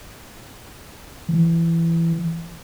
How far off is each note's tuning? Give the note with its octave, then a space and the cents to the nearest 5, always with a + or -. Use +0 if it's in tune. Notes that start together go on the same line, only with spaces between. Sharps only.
E3 +15